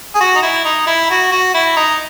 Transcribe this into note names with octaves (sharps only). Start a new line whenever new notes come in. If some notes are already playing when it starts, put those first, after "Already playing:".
G#4
F#4
D#4
E4
D#4
E4
F#4
F#4
E4
D#4